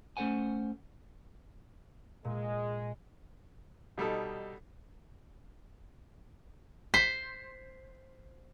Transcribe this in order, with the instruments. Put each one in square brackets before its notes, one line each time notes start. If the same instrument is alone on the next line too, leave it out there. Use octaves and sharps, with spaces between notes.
[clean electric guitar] A3 C#4 A4 C5 F#5 G#5
[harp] A#2 [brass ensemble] G#3
[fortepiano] B2 G3 D#4 A4
[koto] C5 [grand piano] B6